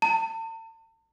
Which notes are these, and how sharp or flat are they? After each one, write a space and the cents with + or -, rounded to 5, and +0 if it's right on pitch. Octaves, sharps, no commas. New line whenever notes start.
A5 +45